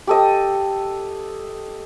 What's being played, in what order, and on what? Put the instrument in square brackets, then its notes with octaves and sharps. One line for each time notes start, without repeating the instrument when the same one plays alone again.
[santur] G4 A4 D#5